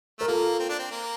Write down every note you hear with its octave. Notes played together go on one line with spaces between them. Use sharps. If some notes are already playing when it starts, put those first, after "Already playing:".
A3 A#4
A#3 F4 A4
C4
D4
C4
A#3